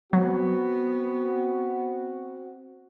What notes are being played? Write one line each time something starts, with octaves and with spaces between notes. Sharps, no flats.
F#3 B3 C4 F#4